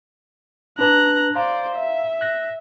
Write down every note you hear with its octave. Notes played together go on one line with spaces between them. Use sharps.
D4 B4 A5 A#5 F#6
C5 D5 F5 A#5
E5
F#6 A#6